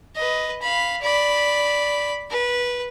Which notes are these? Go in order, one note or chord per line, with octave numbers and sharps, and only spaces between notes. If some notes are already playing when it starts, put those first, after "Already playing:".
B4 D#5
F5 B5
D5 B5
B4